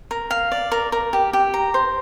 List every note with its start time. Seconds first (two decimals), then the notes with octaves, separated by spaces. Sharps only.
0.11 A#4
0.31 F5
0.52 D5
0.72 A#4
0.92 A#4
1.13 G4
1.33 G4
1.54 A#5
1.74 C5